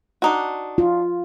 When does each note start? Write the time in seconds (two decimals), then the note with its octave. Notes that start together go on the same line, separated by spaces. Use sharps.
0.22 D4 D#4 F#4
0.78 F4